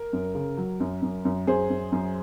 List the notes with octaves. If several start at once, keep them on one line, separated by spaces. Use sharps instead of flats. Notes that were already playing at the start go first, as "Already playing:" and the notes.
Already playing: A#4
F#2
C#3
F#3
F#2
F#2
F#2
F#2 G#4 C5
F#2
F#2